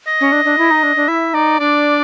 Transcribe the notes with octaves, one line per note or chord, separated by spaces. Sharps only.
D#5
C#4
D4
D4
E4
D#4
D4
D4
E4 E5
D#4 D5
D4 D5